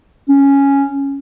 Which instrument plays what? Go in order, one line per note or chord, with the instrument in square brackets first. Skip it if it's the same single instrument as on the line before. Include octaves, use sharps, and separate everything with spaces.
[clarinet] C#4